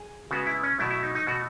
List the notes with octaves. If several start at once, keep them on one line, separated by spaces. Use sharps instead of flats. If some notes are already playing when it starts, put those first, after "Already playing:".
Already playing: G#4
C#3 G#3 B3 F#4
E4
C#4
B2 F#3 A3 E4
E4
D#4
D#4
B2 A3 F#4